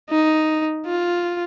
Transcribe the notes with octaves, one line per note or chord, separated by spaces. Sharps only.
D#4
F4